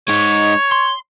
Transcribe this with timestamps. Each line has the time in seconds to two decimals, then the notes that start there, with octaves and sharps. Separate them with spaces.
0.08 G#3 D#4 C#5
0.72 C6